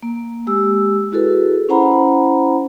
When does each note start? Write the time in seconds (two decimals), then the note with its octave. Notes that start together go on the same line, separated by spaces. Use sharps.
0.03 A#3
0.47 G#3 G4 E6
1.12 E4 F#4 G#4 A4 B4
1.69 C#4 E4 C5 F#5 A#5 B5